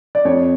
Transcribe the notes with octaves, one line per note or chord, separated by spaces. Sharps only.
D5
F2 C#5